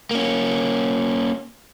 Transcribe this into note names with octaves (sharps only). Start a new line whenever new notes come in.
A#3 C#4